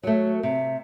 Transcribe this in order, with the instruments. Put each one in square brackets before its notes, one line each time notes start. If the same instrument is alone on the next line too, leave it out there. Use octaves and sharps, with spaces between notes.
[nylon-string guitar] F#3 A3 [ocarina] C#5
[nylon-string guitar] C3 [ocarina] E5